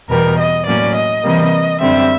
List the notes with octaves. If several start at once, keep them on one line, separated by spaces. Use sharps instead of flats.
E2 B2 G3 A#4
D#5
A2 F#3 A#3 C#4 D5
D#5
C3 E3 G3 A#3
F#2 D3 G3 C4 E5